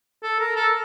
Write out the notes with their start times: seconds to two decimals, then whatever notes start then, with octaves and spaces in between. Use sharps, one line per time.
0.23 A4
0.40 A#4
0.56 A4